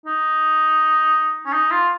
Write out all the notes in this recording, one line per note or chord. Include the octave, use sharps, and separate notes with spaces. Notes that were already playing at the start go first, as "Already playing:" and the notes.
D#4
C#4
D#4
F4